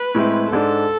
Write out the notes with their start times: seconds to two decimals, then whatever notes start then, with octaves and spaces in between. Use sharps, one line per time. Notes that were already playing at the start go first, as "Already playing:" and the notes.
Already playing: B4
0.15 A2 G#3 C4 E4
0.52 G#2 G#3 D4 A4